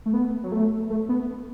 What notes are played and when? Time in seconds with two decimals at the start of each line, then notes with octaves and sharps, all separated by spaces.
0.06 A3
0.14 B3
0.43 F#3
0.52 A3
0.90 A3
1.09 B3